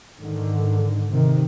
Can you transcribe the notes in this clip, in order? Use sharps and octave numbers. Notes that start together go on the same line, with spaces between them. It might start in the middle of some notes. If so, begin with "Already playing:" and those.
G#2 D3 D#3
C3 D#3